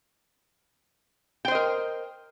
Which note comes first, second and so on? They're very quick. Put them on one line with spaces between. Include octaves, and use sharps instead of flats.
G5 C5 D#5 A#4